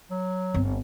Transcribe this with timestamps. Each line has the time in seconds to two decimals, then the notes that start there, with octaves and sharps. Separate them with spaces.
0.11 F#3
0.54 G1 C4